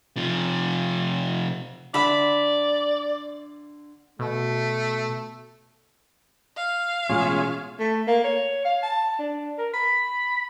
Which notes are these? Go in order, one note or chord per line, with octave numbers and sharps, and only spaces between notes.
C3 F3
D3 D5 E5 B5
B2 A3
F5
A1 B2 G#3 C#4 F4 G#4
A3
A#3
C#5
F5
A5
D4
A#4
B5